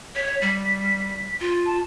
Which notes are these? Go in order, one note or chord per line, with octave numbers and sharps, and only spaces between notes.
C#5 B6
G3
F4
A5